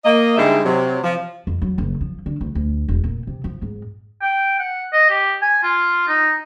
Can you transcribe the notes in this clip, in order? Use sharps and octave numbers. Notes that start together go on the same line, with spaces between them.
A#3 D#5
G#2 D3 G3 D#4 G#4 E5
C3 F#3
F3
F2
F#3
F#1
F3
D3
D2
D2
E1
A#2
C3
F3
G#2
G5
F#5
D#5
G4
G#5
F4
D#4